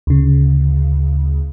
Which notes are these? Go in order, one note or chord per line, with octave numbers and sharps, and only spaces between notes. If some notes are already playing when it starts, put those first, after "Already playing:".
D2 C#3